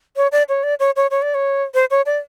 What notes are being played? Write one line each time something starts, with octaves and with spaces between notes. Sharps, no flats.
C#5
D5
C#5
D5
C#5
C#5
C#5
D5
C#5
C5
C#5
D5